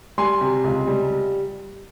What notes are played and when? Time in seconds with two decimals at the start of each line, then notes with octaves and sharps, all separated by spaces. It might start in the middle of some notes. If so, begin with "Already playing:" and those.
0.18 G3 G#5 C6
0.41 C3
0.64 C#2
0.87 G3